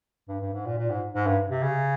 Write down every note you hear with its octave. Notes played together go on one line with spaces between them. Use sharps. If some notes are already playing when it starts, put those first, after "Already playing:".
G2
G2
G#2
A#2
A#2
G#2
G#2
G2
C3
C#3